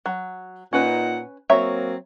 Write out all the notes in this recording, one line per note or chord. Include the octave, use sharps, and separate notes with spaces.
F#3
A#2 C#4 D#4 B4 F#5
F#3 A#3 C4 C#5 E5 A#5